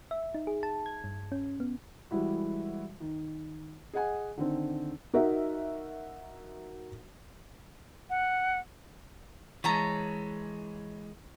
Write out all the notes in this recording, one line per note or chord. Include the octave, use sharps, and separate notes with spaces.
E5
D#4
G#4
A5
G#6
G2
C#4
B3
E3 G3 G#3 E4 F#4
D#3
G#4 D#5 F#5 G#5
D3 D#3 C4
D#4 F#4 A#4 E5
F#5
E3 G#3 C#5 A5 A#5